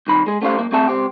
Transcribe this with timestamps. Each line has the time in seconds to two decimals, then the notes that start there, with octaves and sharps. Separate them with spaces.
0.07 C2 D#3 B5
0.27 G#3 G#4
0.42 A3 B3 C#4 G4 C5 F5
0.57 F#2 A#3
0.71 F#2 A3 C4 G#4 E5 A5
0.88 C#2 C4 G4